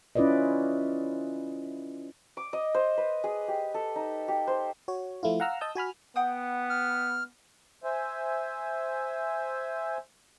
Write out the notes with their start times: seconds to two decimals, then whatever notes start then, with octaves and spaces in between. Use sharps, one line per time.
0.15 C#4 E4 F4 B4 D5 D#5
2.37 D6
2.53 D#5
2.74 C5
2.97 B4
3.24 G#4
3.48 G4
3.74 A4
3.95 D#4
4.28 G4
4.47 C5
4.88 F#4 C#5
5.23 F3 A3 E4 F4
5.40 F5 F#5 A#5 E6 F6
5.61 D#5 A5 D#6 E6 G6
5.75 F#4 G#5 B5 F6
6.16 B3 F#5 G5 D#6
6.70 F6
7.84 C5 E5 G#5